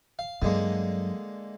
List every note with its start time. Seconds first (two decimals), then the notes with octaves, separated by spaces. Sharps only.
0.19 F5
0.42 G2 D3 F#3 G#3 A#3